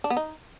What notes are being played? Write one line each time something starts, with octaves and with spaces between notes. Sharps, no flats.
D4
B3
D#4